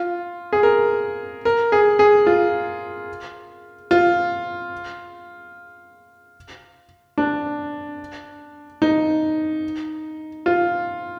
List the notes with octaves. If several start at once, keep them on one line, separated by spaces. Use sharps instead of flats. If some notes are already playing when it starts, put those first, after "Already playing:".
Already playing: F4
G#4
A#4
A#4
G#4
G#4
F4
F4
D4
D#4
F4